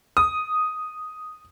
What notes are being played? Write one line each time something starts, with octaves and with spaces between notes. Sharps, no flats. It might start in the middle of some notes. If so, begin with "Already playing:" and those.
D#6